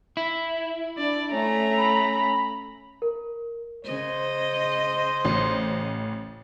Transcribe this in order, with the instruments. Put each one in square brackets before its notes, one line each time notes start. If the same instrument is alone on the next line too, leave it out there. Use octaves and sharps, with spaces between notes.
[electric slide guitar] E4
[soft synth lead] D4 [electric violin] D5
[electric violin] A3 A#5 [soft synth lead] C#4
[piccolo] B5
[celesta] A#4
[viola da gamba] C#3 D#5 [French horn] C5
[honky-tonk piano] A1